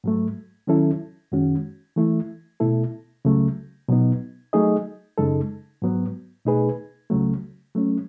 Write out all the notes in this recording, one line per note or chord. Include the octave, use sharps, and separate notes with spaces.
G#2 F#3 A3
D#3 F#3 C#4 E4 A4
F#2 D#3 G#3 C#4 F#4
E3 A3 E4
B2 A3 E4 A4
C#2 C#3 F#3 A3
B2 F#3 B3 D#4
F#3 A3 D#4 G#4 D#5
F#2 C#3 G#3 D#4 A4
G#2 F#3 B3
B2 A3 D#4 G#4 B4
C#2 C#3 F#3 A3
F#3 A3 C#4